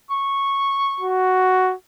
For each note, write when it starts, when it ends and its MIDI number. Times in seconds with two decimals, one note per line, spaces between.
0.10 1.22 85
1.00 1.75 66